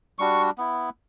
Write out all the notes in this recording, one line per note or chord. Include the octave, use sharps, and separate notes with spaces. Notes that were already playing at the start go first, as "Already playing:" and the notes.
G3 D4 F#4 C#6
B3 E4